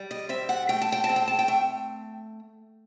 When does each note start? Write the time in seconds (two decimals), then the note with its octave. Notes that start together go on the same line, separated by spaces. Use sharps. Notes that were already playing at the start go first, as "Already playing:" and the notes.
Already playing: G3
0.11 D#5
0.29 C4 E5
0.49 F#5
0.69 A3 G5
0.81 A5
0.92 G5
1.04 A5
1.09 C4
1.16 G5
1.28 A5
1.39 G5
1.48 A3